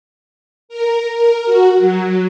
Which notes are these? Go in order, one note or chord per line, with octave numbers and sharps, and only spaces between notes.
A#4
A#4
F#4
F#3